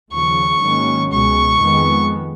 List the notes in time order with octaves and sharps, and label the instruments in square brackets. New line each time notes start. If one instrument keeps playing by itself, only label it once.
[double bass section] D#2 C#3 F3 [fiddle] C#6
[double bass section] G#2 D#3 F#3 A#3 C#4
[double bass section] C#2 B2 G#3 [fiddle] C#6
[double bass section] F2 D#3 G#3 B3